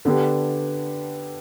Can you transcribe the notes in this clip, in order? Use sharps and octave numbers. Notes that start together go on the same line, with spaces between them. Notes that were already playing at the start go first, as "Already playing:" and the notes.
D3 B3 D4 G4